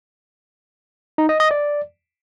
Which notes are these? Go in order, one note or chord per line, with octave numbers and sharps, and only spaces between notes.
D#4
D#5
D#5
D5